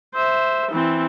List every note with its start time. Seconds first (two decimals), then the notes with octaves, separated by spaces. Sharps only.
0.14 C5 E5
0.72 E3 C4